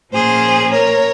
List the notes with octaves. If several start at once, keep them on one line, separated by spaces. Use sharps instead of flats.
A#2 F3 A#3 C#4 G#4 C5
A#4 C#5